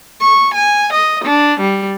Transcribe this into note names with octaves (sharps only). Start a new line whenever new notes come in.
C#6
G#5
D#5
D4
G3